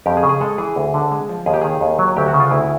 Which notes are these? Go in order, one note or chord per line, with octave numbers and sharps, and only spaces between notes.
F2 G4
G#4
C#3
G#4
G#3 A4
E3 G#4
D2
D3
G#3
F3
D#2 G#4
G4
D#3 G#4
D#2
F#3
D2 G4
F#4
C#3
F4
D2 E4